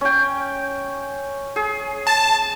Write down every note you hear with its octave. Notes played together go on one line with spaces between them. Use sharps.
C#4 G5
G#4
A5